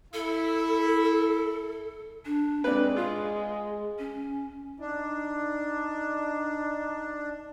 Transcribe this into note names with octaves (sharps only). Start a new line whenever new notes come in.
E4 A4
D4
G#3 C4 D4 B4
F4 G#4
C#4
D4 D#4